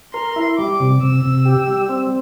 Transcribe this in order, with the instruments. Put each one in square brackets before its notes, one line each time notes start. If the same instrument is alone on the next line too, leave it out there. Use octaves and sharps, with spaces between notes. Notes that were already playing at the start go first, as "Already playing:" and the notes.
[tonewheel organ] A#4 [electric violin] C6
[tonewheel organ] E4
[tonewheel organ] G3 [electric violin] D6
[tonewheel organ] C3
[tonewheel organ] C3 [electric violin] E6
[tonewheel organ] C3
G4
G3
C4